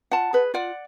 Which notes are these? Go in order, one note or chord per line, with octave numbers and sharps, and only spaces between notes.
F4 F#5 A5
G#4 B4
F4 D5 F#5